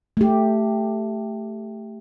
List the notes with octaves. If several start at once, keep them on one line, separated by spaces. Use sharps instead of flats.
A3 G4